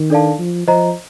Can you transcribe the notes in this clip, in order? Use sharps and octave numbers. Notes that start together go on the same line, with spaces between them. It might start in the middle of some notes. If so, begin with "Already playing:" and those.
Already playing: D#3
D4 A4 D5 F5 A5
F3
F3 C5 D#5 A#5